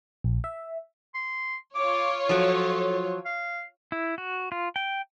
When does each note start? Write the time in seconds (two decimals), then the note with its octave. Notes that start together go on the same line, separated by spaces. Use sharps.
0.24 A#1
0.44 E5
1.14 C6
1.75 F4 C#5 D6
2.29 F3 F#3 A4
3.26 F5
3.92 E4
4.18 F#4
4.52 F4
4.76 G5